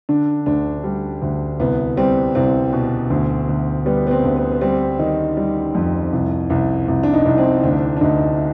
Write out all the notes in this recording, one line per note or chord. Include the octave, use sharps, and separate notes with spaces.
D3 D4
D2 D4
G3
D2
C2 B3
G3 C4
C2 C4
B2
D2
D2
G3 B3
B3
C4
D2
B3
B3
G3 C4
D#3 D#4
G3
F2
C2
C2
C2
D4
D#4
C2
C4
D2 D4
D4
D2 D#4